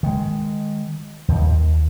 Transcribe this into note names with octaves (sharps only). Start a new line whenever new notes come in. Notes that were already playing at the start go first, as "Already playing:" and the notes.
D#3 G#3
D#2